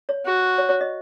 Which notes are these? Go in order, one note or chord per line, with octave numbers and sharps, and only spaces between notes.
C#5
F#4
C#5
C#5
D#5